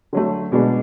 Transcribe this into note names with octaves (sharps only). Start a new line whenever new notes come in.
D3 F#3 A3
B2 G#3 B3 D4